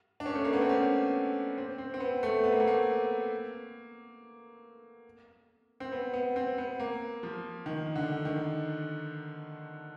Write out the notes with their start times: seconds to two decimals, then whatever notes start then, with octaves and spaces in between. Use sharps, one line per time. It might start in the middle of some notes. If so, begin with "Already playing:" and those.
0.20 D4
0.26 C#4
0.35 A3
0.44 A#3
0.53 B3
0.61 C4
0.69 C#4
1.58 C4
1.78 C4
1.94 C4
2.00 B3
2.23 A3
2.44 B3
2.52 A#3
2.60 A3
2.67 A#3
5.80 C4
5.92 B3
6.13 B3
6.36 C4
6.58 B3
6.80 A#3
7.23 F3
7.66 D#3
7.96 D3
8.25 D#3